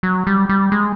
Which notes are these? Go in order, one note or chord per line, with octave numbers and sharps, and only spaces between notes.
F#3
G3
G3
G#3